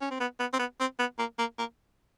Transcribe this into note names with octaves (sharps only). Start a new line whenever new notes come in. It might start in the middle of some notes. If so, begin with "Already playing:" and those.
C#4
C4
B3
B3
C4
B3
C4
B3
A#3
A#3
A#3